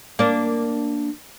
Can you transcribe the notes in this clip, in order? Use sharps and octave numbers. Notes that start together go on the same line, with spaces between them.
A#3 D4